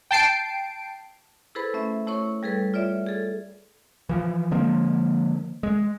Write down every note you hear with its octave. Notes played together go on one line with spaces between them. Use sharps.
G5 A5 C7 D7
E4 G#4 A4 B4 C5 B5
A3 C#4 E5
A3 E4 C#5 C#6
G3 G#4 A4 B4
F4 C#5 D5 E5
G#4 A4
E3 F3
D3 F3 G#3 A#3
G#3